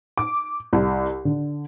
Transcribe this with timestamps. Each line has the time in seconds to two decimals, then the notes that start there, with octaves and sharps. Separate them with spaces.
0.18 D6
0.73 C2
1.25 D3